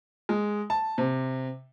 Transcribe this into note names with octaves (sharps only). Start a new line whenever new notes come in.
G#3
A5
C3